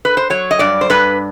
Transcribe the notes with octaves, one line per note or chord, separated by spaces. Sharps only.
B4
C5
F#3 C#5
D#5
G2 D5
C5
G2 B4